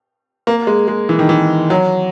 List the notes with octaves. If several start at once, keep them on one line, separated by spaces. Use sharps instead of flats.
A#3
G#3
G#3
E3
D#3
E3
F#3